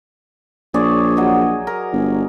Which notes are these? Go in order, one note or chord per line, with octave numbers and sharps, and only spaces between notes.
A#1 G#4 C#5 D5
F#3 D#5
A#4
G1